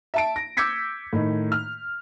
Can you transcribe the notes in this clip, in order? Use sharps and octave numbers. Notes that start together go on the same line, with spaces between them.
E5 A5 D7
A#6
D6 E6 G6 G#6 B6 C#7
A2 D#3
F6